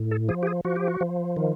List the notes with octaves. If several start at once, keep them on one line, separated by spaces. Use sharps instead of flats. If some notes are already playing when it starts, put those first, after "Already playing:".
Already playing: A2
A4
F3 G#4
G4
G#4
F3 F#4
G4
F#4
F3
D#3